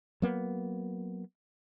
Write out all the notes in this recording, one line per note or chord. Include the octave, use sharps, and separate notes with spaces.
F#3 A#3 B3